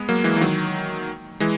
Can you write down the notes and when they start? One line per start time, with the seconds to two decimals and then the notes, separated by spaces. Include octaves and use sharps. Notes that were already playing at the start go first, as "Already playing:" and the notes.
Already playing: G#3 B3
0.09 F#3 A#3
0.24 E3 G#3
0.36 E3
0.41 D#3 F#3
1.40 E3 G#3